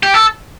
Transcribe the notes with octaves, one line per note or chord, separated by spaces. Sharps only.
G4
A4